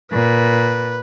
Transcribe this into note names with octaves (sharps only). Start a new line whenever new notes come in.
A#2 B4